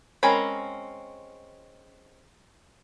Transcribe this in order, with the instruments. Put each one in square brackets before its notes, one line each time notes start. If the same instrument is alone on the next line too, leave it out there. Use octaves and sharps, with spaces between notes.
[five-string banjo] G#3 C4 C#4 A#4 B5